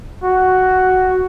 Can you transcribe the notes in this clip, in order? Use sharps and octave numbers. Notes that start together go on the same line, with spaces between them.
F#4